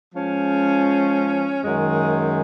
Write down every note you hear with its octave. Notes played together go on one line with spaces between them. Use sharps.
F3 G#3 C#4
F#2 D#3 G#3